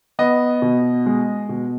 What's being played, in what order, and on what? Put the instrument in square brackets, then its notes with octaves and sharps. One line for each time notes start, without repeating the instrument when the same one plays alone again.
[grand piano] B3 D#5
B2
G#3
B2